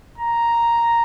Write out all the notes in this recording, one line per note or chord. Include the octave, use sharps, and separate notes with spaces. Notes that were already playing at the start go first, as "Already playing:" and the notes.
A#5